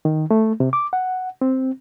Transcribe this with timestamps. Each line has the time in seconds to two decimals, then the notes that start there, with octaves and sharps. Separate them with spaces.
0.05 D#3
0.31 A3
0.60 C3
0.73 D6
0.93 F#5
1.41 C4